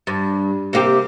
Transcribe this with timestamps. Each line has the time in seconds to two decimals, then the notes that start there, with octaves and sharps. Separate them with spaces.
0.07 G2
0.73 C3 A#3 G4